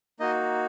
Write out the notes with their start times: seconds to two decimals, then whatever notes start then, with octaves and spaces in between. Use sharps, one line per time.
0.19 A#3 D#4 F#4 D#5